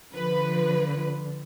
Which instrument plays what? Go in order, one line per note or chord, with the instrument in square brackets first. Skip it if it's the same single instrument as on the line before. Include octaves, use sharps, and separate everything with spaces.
[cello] D3 [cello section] F3 [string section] B4